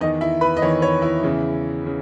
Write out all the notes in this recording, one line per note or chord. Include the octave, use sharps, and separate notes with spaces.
E2 D#3 D#4 D#5
E4 E5
B4 B5
D#5
E2 D#3 C#5
C#5
E4 E5
E2 C#3 E3
C#3